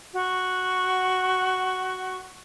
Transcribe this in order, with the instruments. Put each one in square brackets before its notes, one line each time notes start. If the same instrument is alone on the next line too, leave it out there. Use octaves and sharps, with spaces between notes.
[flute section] F#4 C#6